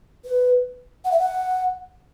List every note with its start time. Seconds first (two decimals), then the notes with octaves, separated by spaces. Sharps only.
0.25 B4
1.05 F#5
1.11 E5
1.20 F#5